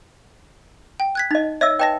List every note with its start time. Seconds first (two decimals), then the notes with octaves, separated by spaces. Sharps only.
1.00 G5
1.15 F#6 G#6 B6
1.31 D#4 D#5 A6
1.61 C#5 D#5 E5 E6
1.79 B4 D#5 G5 A5 A#6